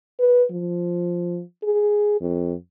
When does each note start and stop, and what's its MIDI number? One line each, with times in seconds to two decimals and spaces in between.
0.20 0.44 71
0.51 1.42 53
1.64 2.17 68
2.21 2.54 41